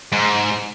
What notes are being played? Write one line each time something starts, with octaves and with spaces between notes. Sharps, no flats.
G#2